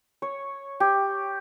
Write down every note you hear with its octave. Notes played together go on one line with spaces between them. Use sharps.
C#5
G4